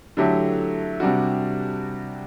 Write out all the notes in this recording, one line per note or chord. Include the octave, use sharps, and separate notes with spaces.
D3 F#3 A3 E4 G4
C3 G3 D4 F#4